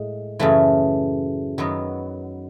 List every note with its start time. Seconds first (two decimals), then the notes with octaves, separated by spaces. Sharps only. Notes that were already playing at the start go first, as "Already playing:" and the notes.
Already playing: A2 G#3
0.39 F#2 C#3 E3 A3
1.58 F#2 D#3 F#3 B3